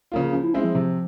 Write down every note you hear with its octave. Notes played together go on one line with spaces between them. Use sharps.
C#3 F3 A#3 F4
F3 C#4
E4
G#3 C4 C#4 E4
F3
C3 F3